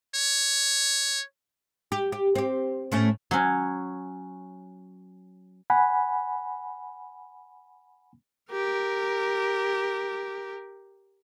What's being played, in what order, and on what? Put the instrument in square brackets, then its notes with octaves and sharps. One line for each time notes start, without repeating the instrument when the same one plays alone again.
[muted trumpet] C#5
[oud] G4
G4
C4 G4
A2 A3 C#4
[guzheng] F#3 C#4
[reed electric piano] F#5 G#5 B5
[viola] G4 A#4